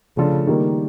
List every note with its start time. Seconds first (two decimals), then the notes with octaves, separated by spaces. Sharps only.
0.17 C#3 F3 A3 D4 F4 A4
0.47 D#3 G3 A#3